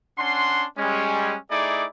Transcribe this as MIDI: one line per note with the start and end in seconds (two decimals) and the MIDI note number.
0.19 0.65 61
0.19 0.65 62
0.19 0.65 78
0.19 0.65 84
0.78 1.36 55
0.78 1.36 56
0.78 1.36 61
1.51 1.86 57
1.51 1.86 63
1.51 1.86 64
1.51 1.86 68
1.51 1.86 74
1.51 1.86 86